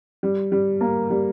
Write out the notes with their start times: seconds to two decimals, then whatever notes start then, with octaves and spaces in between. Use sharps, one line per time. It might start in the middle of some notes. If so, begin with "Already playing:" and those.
0.23 G3
0.52 G3
0.81 A#3
1.10 G3